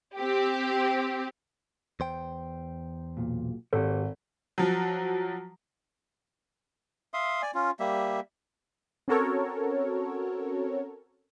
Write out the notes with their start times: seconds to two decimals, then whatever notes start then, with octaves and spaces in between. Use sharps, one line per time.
0.15 C4 G4
2.00 E2 C5 G5
3.17 B1 A#2
3.73 G#1 G4 A4 C5 C#5
4.58 F3 F#3
7.14 E5 F5 C6 D#6
7.42 D5 G#5
7.54 C#4 F4
7.80 G3 A#3 G4 E5
9.08 C4 C#4 F#4 A4 A#4 C#5